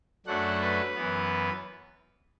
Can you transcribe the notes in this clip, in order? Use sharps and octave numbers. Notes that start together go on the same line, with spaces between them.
F#2 F#3 A3 D4 F#5
B4
F#2 E3 B3